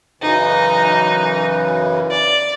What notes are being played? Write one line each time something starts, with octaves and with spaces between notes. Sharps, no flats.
F#2 C#3 E3 D#4
D5